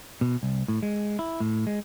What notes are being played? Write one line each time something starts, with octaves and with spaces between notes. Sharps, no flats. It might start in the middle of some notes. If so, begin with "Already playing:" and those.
B2
C2
A2
G#3
E4
A2
G#3